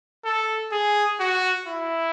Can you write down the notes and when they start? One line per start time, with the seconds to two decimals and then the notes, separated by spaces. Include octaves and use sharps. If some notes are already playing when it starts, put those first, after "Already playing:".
0.25 A4
0.72 G#4
1.20 F#4
1.67 E4